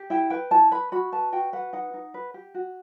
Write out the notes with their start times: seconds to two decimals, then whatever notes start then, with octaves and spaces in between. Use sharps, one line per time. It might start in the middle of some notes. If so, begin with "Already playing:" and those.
Already playing: G4
0.10 E4 G5
0.30 B4 G5
0.51 E4 A5
0.71 B4 B5
0.92 F#4 B5
1.12 B4 A5
1.32 F#4 G5
1.53 B4 F#5
1.73 D#4 F#5
1.94 D#4
2.14 B4
2.34 G4
2.54 F#4